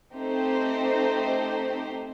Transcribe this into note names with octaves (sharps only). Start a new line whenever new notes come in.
A3 C4 D#4 G4 C5